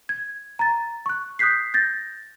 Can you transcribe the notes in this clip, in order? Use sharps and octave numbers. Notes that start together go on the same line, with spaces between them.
G#6
A#5 A6
C#6 F#6
D#6 F#6 G6 B6 C7
G6 A6 A#6